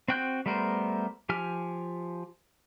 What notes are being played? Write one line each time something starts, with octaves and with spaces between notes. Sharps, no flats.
C4 F#4 G5 F#6 G6
G3 A3 B3 A#4 C5
F3 G4 G#5 F6